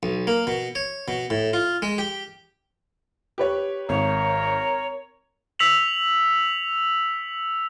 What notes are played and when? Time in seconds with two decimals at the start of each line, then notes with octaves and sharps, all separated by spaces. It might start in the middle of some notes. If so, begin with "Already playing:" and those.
0.03 B1
0.27 A#3
0.47 B2
0.75 C#5
1.08 B2
1.30 A2
1.53 F4
1.82 G#3
1.98 G4
3.38 G4 B4 C#5
3.89 G#1 A#4 C#5
5.59 E6 B6 C#7 F7 F#7